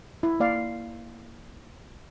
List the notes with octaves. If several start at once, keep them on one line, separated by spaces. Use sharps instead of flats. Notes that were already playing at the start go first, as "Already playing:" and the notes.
E4
A#3 D5 F5